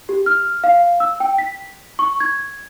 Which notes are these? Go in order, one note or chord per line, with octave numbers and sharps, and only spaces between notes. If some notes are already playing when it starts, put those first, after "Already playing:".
G4
F6
F5
E6
G5
B6
C#6
G#6